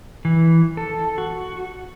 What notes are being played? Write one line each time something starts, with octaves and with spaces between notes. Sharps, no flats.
E3
A4
F#4